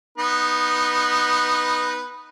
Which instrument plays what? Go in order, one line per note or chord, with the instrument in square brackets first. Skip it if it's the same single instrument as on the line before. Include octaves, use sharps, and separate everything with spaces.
[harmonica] B3 D#4 B4